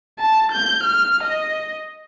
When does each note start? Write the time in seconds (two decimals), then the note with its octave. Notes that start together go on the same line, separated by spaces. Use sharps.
0.19 A5
0.52 G6
0.83 F6
1.23 D#5